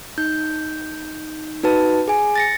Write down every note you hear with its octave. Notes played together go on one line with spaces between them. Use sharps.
D#4 G6
D#4 F#4 B4 A5
G#4 G#5
A6 A#6 C#7